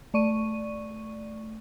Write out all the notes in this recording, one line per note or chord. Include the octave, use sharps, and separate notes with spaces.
A3 D5 C#6 D#7